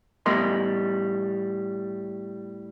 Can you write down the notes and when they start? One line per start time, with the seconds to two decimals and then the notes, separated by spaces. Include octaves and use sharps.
0.26 A2 G3 B3 A#4 D#5 C6